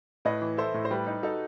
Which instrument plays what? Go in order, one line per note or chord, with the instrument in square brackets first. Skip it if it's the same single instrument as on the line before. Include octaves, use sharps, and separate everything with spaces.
[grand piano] A2 [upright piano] B4 D#5
[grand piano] E3
[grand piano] E4 [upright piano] A4 C5
[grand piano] A2
[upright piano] C5
[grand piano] G3 [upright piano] G4 B4
[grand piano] D#4
[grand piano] D#4 [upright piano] F#4 A4